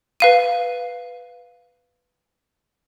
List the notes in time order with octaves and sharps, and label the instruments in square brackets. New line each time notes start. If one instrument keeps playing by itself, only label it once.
[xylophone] B4 F5 D#7